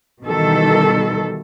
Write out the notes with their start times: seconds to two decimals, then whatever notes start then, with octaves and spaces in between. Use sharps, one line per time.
0.23 B2 D#3 E3 G3 A4